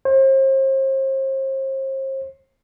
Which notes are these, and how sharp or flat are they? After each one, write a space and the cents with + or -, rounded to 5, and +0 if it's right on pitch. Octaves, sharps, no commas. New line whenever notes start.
C5 +40